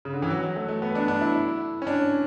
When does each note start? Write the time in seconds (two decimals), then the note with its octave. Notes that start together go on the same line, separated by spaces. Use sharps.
0.05 C#3
0.13 D3
0.22 E3
0.30 F#3
0.43 F#3
0.56 A3
0.68 A3
0.82 B3
0.95 D4
1.08 D4
1.21 E4
1.82 C#4
1.87 D4